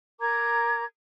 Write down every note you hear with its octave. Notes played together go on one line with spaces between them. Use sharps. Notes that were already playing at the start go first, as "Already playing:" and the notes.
A#4 A#5 D6 G#6